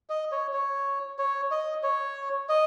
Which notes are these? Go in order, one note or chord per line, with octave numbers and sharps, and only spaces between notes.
D#5
C#5
C#5
C#5
D#5
C#5
D#5